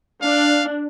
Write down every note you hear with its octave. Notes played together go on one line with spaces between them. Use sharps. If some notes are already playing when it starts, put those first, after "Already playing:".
D4 F5